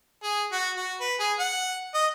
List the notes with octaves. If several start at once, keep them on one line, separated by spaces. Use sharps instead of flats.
G#4
F#4
F#4
B4
G#4
F#5
D#5